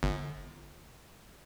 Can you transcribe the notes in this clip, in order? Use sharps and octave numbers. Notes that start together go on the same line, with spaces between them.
G1